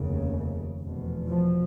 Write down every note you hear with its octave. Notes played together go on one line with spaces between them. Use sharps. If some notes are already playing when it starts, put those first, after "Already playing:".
Already playing: F1 D#2 C#3
F1 E2 B2
F3